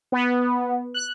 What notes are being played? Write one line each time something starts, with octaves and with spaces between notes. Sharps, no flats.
B3
F#6